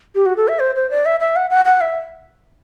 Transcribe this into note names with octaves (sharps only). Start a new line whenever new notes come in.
G4
F#4
A4
E5
C5
C5
D5
E5
E5
F#5
F#5
F#5
E5